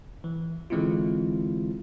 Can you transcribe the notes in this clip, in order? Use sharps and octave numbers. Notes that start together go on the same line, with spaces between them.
E3
D3 E3 G#3 C4 E4 F4